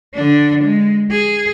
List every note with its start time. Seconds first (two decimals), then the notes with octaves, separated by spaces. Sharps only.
0.14 D3 D4
0.63 G#3
1.11 G#4